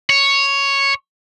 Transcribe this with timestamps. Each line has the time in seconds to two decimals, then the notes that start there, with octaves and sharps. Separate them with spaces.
0.10 C#5